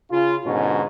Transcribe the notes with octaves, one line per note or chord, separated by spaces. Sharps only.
C#3 F4
G#2 B2 D3 C#4 F#4